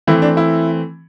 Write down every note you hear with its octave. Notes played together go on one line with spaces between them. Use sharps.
E3 A3 C4 E4
D4
E4